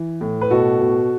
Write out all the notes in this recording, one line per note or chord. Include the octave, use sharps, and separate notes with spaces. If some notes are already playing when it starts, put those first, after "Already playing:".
Already playing: E3
A2
B4
B2 F#4 A4
B2